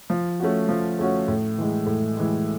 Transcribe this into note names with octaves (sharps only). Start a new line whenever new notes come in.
F3
A3 C#4 F#4
F3
A3 C#4 F#4
A2
E3 G#3
A2
E3 G#3